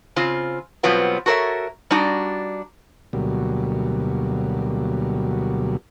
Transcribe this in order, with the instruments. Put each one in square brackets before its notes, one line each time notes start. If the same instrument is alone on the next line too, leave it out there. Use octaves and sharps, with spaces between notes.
[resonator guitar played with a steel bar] C#3 C4 F4
B2 F#3 G3 B3 C4 F4
F#4 A4 A#4 C5 C#5 E5
G3 D4 D#4 F#4 D5
[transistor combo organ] D2 B2 F#3 G3 A#3